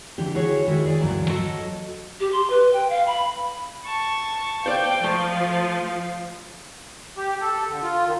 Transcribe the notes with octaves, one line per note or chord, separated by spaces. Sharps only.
D3 E3 D4 G4
E4 F#4 G#4 C#5
D#3 G#3 E4 F#4
G#4 D5 G#5
D2 G2 E3 F#3 G3 A#3
F#3 F#4 A4 D#5 A5
G4
C6
B4
G5
F5
B5
A5 C#6
C5 D5 F5 G5
F3 A3
G4
A4
D3
F4
D#3